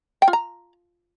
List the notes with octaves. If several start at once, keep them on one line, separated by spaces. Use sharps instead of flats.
G5
F4
A#5